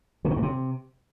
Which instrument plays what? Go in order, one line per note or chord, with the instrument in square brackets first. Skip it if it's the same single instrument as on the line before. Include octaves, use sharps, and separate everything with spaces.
[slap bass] C3
D#3
G2
C3